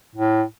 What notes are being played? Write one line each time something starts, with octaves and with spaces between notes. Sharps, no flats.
A2